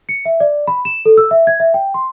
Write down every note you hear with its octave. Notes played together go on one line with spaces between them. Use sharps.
C#7
E5
D5
B5
E7
A4
E6
E5
G#6
E5
G5
C6